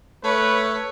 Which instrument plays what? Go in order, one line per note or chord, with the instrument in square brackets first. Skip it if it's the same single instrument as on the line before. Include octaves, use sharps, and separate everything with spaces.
[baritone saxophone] A3 [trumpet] B4 [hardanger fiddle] C#5